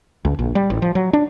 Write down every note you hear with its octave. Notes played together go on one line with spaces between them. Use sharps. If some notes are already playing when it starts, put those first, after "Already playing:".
C#2
A#1
G3
A1
F3
F#3
D4